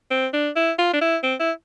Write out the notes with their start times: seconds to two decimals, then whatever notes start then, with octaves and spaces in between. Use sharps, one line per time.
0.11 C4
0.33 D4
0.56 E4
0.79 F4
0.94 D4
1.01 E4
1.23 C4
1.40 E4